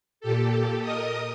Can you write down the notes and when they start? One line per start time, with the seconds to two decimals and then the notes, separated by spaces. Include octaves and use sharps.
0.20 A#2 G4 A4
0.81 A#4 D#5 D#6